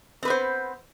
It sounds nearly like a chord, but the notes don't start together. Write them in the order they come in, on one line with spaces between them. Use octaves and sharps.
C4 B4 B3 C5